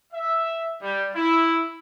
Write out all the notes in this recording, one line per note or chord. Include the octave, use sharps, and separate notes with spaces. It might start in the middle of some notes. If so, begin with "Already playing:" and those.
E5
G3
E4